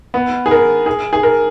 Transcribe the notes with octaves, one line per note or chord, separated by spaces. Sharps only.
B3
G#4
A#4
G#4
G#4
A#4